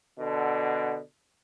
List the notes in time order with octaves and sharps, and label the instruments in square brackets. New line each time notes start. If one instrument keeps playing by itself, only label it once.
[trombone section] B2 D3